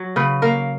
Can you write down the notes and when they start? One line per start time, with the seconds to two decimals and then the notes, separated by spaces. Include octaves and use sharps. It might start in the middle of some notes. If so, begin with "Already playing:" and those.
Already playing: F#3
0.16 C#3 B4
0.42 A#3 A#4